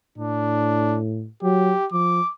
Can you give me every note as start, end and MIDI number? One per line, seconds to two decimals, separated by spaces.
0.18 1.28 45
0.18 0.98 62
1.43 1.74 54
1.43 1.86 67
1.92 2.21 53
1.92 2.32 86